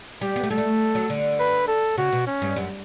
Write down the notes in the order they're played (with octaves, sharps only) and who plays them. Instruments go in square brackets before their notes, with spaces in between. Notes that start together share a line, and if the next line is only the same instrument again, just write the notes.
[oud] G3 [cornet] G4
[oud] B3
A3
[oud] G3 [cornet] A4
[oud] A3
F#3
D3
[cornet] B4
A4
[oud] C#3 [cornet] F#4
[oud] B2
[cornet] C#4
[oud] G2
F#2